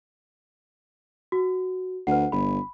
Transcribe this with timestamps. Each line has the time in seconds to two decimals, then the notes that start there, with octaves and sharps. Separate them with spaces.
1.32 F#4
2.07 D2 B4 F#5
2.32 G1 B5